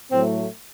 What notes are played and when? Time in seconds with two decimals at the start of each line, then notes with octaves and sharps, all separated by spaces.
0.11 A2 F#3 A3 C4